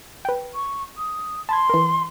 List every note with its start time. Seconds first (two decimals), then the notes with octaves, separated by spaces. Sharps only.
0.25 B4 G5
0.55 C#6
0.98 D#6
1.49 A5 B5 C6 G#6
1.69 E3 A#4